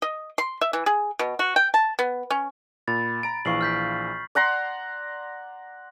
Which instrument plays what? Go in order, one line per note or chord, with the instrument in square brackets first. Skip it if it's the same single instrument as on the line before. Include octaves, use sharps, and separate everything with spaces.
[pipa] D#5
C6
E5
E3
G#4
B2
F#4
G5
A5
B3
C#4
[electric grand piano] A#2 [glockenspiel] B5 A6
[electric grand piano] A#5 D7
[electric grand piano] A#1 E3 F5 [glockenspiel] C#6 C7 F#7
[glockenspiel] F6 G6 B6
[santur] D5 F#5 A#5 C6